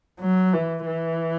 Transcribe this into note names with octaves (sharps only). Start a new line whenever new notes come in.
F#3
E3
E3